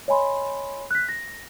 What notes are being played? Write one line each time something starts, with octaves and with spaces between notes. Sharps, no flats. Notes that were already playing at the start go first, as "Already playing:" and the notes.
C#5 D#5 G#5 B5 C6
F#6 B6
A#6